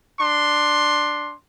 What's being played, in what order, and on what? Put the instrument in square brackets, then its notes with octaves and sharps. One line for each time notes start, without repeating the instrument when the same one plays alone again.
[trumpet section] D4 C6